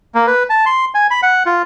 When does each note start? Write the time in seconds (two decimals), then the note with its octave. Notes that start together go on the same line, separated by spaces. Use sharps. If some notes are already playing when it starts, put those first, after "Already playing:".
0.15 A#3
0.27 B4
0.49 A5
0.66 C6
0.95 G#5
1.11 B5
1.23 F#5
1.46 F4